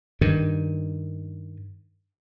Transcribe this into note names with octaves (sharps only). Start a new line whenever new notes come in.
G2 D#3